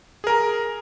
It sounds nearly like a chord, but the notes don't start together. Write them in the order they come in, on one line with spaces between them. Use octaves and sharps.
G#4 A#4 A#5